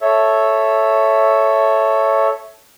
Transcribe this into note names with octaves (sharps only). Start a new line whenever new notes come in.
A4 C#5 E5